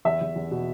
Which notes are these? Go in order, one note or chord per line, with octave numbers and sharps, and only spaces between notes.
E2 E5
E2
E2
B2